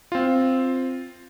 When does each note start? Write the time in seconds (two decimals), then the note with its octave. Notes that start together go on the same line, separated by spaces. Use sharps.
0.12 C4 F4